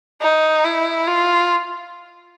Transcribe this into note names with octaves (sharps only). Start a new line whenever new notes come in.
D#4
E4
F4